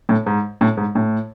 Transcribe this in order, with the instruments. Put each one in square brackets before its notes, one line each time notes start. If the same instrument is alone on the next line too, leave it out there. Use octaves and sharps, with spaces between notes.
[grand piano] A2
G#2
A2
G#2
A2